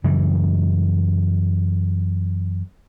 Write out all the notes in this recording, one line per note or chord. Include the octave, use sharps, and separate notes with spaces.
F#2 C#3 E3 G3